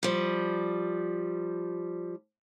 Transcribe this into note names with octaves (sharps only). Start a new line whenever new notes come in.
F3 G3